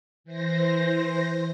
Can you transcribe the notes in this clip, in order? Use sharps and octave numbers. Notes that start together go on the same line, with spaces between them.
E3 C5 A#6